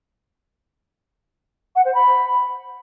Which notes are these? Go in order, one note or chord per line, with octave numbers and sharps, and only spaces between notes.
F#5
C5
B5